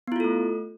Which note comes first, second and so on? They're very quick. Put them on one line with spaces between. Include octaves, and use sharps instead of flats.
B3 E4 F4 A4 A3